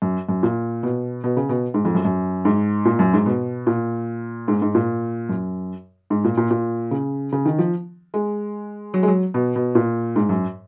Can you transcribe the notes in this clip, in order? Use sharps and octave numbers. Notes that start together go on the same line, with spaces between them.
F#2
F#2
A#2
B2
B2
C#3
B2
G#2
F2
F#2
F#2
G#2
A#2
F#2
G#2
B2
A#2
G#2
G#2
A#2
F#2
G#2
A#2
A#2
A#2
C#3
C#3
D#3
F3
G#3
F#3
G#3
F#3
B2
B2
A#2
G#2
F#2